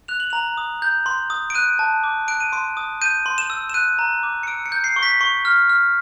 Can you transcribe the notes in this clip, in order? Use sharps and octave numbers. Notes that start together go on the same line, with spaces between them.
F#6 F7
F#7
A#5 F7
D#6
G6
C6
D#6
D7
F#6 D#7
A5
D6
F#6 D7
D#7
C6 D7
D#6
G6 D#7
C6
E7
E6
E7
F#6 D#7
A#5
D6
C#7
E6 D7
C#7
G6
C7
C#6
B6
C#6
F6
F6